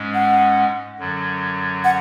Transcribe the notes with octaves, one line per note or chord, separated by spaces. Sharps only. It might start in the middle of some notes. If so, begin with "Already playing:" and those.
Already playing: G#2 G#3 C#4
F#5
F#2 D3 F#3
F#5